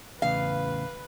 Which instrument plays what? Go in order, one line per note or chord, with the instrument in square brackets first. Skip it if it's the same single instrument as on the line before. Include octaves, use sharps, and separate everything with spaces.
[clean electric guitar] E2 A2 C#3 [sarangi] B4 [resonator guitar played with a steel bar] F5